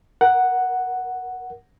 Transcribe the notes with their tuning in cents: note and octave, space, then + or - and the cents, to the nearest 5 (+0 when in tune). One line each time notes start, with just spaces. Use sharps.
A#4 +20 F#5 +0